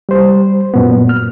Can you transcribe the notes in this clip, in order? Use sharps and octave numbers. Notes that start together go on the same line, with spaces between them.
G3 C5
F#2 A#2 B3
F6